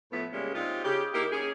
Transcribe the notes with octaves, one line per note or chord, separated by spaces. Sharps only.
A2 F3 A3 B3 E5
C#3 G3 G#3 A#3 C#4
C3 D#4 F4 G4
C#3 G4
A#3 D#4 E4 G4
C#4 G#4